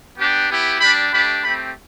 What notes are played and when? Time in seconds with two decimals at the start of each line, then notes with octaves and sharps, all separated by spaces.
0.18 B3 D4 G4
0.49 B3 E4 G4
0.79 G3 D4 G4 B5
1.12 A3 D4 G4 B5
1.42 A3 C4 G4 B5